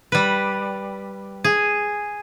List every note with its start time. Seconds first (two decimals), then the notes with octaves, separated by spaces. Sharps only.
0.12 G3 B4
1.44 G#4